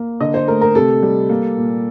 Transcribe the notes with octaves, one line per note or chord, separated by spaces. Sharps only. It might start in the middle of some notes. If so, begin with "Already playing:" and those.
Already playing: A#3
D3 D#5
C5
A3 A#4
A#4
C3 A4
G3
A#3
A#2